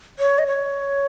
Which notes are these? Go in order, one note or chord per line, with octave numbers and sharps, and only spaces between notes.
C#5
D#5
C#5